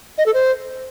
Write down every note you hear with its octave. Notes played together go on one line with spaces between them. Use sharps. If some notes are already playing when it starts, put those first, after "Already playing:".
D#5
A4
C5